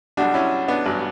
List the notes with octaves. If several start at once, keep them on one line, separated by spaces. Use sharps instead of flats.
B1 B2 G3 D4 F#4
C#4 E4
B3 D4
A1 G2 F#3